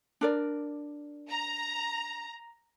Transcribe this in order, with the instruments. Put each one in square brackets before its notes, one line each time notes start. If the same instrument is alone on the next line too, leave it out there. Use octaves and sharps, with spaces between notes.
[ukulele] D4 A#4 D5
[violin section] A#5